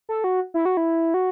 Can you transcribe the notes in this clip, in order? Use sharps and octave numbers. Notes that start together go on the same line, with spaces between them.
A4
F#4
E4
F#4
E4
F#4